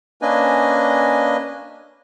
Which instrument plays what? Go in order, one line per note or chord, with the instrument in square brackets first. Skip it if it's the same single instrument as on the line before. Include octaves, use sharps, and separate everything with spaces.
[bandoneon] A#3 C#4 D4 B4 D#5 G#5